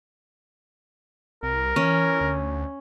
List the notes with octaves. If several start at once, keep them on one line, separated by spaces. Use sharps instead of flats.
C2 A#4
E3 C#4
D2